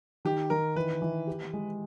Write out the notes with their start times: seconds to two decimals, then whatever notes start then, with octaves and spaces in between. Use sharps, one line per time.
0.25 D#3 G4
0.50 D#3 A#4
0.76 E3 B4
1.02 E3
1.27 G4
1.53 G#3